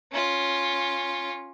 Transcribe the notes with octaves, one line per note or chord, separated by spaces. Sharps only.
C#4 F4